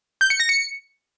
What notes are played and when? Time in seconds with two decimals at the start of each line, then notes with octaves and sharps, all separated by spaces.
0.21 G6
0.30 C#7
0.40 A#6
0.49 C#7